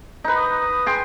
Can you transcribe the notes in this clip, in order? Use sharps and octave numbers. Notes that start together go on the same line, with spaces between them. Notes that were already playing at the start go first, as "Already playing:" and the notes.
D#4 B4
D#6
G#4 G5 C6